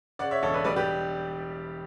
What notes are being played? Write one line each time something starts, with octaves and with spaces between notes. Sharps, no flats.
C#3 D5 F#5
C#5 E5
E1 A4 C#5
B4 D5
G3 B4 D5
G4 B4